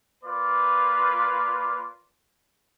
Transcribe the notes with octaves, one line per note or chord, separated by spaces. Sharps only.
A#3 F4 B4 D5